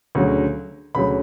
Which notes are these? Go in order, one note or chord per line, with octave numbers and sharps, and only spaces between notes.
D2 C#3 F#3
D2 C#3 F#3 B5